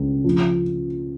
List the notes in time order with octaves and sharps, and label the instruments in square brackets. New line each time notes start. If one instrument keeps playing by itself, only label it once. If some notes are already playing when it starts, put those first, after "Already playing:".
Already playing: [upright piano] C#2
F3